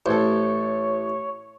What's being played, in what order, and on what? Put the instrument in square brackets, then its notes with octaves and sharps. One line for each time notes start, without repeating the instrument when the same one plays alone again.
[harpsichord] A1 [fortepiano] A4 C5 [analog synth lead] C#5